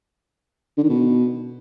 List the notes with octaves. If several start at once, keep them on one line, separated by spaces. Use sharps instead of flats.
D3
D#3
B2